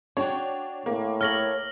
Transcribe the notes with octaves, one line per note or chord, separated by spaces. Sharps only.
D4 F#4 C#5 G5
A2 A#3
A4 C#5 F6 A#6 F#7